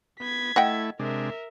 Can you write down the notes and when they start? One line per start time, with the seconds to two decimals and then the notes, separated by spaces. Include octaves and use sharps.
0.20 B3 G#6 B6
0.56 A3 E4 D#5 F#5 G5
0.99 C3 G#3 D4 A#4 E5